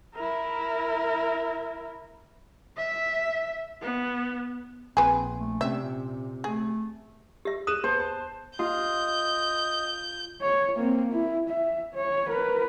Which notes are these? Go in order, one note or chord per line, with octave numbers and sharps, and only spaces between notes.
E4 A#4
E5
B3
A#1 C4 G#4 B4 G#5
A3
C3 C#4 D5 E5
A#2
A3 G#4
G4 E5
G#4 D#6 F#6 D#7 E7
B3 C5 A5
A5
F4 D#5 G6
C#5
A#3 C4
E4
E5
C#5
A#4 B4